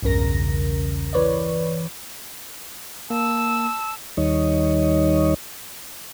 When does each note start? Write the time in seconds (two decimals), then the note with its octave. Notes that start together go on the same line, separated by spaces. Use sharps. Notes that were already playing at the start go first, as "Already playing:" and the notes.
0.02 B1 E2 G2 C#3 A#4 A#6
1.13 E3 B4 C#5 D5
3.10 A#3 A5 E6
4.17 D#2 D#3 G3 D#4 C#5 D#5